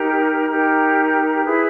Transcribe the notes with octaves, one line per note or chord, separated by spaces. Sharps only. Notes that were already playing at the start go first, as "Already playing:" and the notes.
Already playing: D#4 G4 A#4
D#4 G4 A#4
E4 G#4 B4